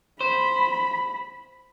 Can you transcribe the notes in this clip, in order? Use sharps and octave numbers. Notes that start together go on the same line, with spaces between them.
C5 B5